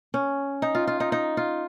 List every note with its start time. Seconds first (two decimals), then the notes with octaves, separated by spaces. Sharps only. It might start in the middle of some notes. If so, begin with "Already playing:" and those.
0.14 C#4
0.62 D#4
0.75 F4
0.87 F4
1.00 D#4
1.12 D#4
1.37 F4